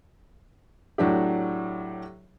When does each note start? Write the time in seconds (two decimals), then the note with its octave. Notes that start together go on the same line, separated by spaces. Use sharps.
0.98 A2 F#3 D4 G4